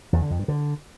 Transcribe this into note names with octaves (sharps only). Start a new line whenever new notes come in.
E2
D3
F2
G2
D3